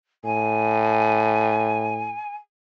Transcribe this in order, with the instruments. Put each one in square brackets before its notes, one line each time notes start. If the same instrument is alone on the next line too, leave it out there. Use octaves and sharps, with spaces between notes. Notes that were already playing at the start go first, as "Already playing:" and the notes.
[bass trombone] A2 [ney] G#5